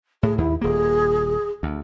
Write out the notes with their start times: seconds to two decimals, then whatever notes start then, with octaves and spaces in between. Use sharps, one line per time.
0.23 A2 G#4
0.38 D#2 E4
0.61 D#1 A#3 G#4
1.63 D2